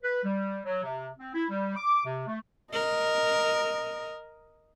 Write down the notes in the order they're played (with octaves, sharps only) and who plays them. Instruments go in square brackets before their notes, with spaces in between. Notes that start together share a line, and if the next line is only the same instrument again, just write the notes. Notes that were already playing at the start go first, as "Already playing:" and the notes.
[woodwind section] B4
G3
F#3
C3
C4
E4
G3
D6
C3
A3
[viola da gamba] A#4 [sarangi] D#5